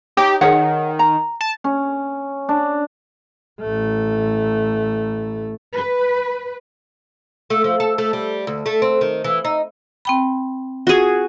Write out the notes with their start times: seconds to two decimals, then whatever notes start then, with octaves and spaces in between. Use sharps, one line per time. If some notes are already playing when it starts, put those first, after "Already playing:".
0.17 D#4 G4 C#5 G5
0.41 D#3 G#4 C#5 F#5
0.99 A#5
1.41 A5
1.64 C#4
2.49 D4
3.61 A1 A3
5.74 B4
7.50 A3
7.64 F3
7.80 A4
7.98 A3
8.13 G3
8.47 D2
8.66 A3
8.82 C4
9.01 D#3
9.24 E3
9.45 D#4
10.05 C4 G5 B5
10.87 F4 F#4 G#4